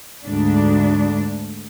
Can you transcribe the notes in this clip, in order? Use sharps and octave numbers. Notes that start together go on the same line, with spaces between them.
D2 G#2 D4